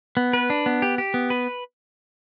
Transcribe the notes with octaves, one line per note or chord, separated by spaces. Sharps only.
B3
B4
D4
B3
G4
G4
B3
B4